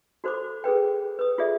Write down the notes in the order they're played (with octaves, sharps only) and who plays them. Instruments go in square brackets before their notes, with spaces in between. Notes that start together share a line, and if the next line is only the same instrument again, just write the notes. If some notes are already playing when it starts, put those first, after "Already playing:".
[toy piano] F#4 A4 C5 B5 D6
G#4 A4 B4 G5
B4 D#6
F4 G#4 A4 D5 E5